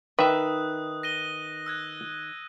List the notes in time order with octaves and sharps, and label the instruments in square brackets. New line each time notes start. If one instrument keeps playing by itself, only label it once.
[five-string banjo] D#3 [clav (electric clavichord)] B4 E5 [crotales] D#6 F#6
[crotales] A#6 D#7 G7
E6 F#6 G#6